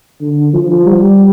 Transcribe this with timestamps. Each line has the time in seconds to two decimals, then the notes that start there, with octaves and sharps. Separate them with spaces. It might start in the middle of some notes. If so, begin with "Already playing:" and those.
0.21 D3
0.53 F3
0.86 G3